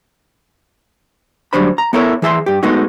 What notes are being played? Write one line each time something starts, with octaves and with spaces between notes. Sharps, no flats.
D2 F#3 G3 D4 C5 B5
A#5
B3 E4 A4 A#4 C#5 E5
E3 G#4 E5 A5 C6
G2 G4
G#3 A3 B3 D#4 F#4